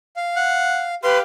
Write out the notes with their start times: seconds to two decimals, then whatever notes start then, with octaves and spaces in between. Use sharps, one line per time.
0.16 F5
0.36 F#5
1.03 G4 B4 F5 C6